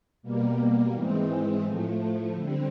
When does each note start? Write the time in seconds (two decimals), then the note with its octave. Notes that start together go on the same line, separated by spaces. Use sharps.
0.22 B2 G3 A#3
0.92 G#2 E3 G#3 C4
1.63 A2 F3 A3
2.33 D3 G3 C4